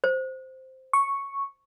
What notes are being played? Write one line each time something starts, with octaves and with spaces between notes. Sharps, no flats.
C5
C#6